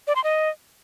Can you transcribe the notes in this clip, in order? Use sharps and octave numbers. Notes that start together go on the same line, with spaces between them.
D5
C6
D#5